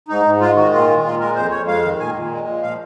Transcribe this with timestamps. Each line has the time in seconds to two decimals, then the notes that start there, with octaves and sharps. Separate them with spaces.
0.08 G#2 D#4
0.25 G#2
0.40 G#3 F4
0.56 D#3 F#4
0.72 A#2 F4
0.88 G#3
1.03 A#2 F4
1.20 G#3 A#4
1.36 F2 C5
1.51 F2 C#5
1.67 G#3 F5
1.84 D#3
1.99 A#2 G#5
2.14 A#2
2.31 G#3
2.47 F3
2.62 A#2 F5